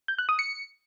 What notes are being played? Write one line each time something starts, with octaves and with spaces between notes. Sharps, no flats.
G6
F#6
D#6
C#7